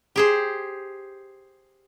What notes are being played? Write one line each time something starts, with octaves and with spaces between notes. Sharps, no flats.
G4 G#4 C5